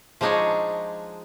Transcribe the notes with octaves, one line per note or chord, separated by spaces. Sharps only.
F3 G#3 D4 D#4 G#4 C#5